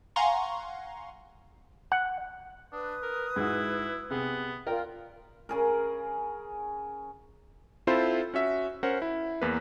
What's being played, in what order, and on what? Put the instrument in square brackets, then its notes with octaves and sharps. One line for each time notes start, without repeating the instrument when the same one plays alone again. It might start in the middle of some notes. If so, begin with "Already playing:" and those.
[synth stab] F5 F#5 G#5 A#5 C6 C#6
[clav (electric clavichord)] F#5
[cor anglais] D4 [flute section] B4 D#6
[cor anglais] A#4
[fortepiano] G#2 F#4 [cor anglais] E4
[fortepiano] C3 G#4 [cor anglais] B3
[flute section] F4 [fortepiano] A#4 D5 G5
[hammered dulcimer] C#3 G#4 A#4
[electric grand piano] C4 E4 F4 A4 C5 B5
C#4 F#4 E5
C#4 A#4 C5 F#5
E4
E2 A#3 B4